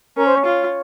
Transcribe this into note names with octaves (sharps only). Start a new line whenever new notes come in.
C#4 A#4
C5
C#5
F4